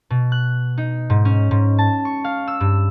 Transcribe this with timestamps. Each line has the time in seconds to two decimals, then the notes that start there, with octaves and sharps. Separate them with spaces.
0.10 B2
0.32 F#6
0.78 D#4
1.10 G#2
1.25 C#4
1.51 G#2
1.78 A5
2.05 C#6
2.24 F5
2.48 E6
2.60 G2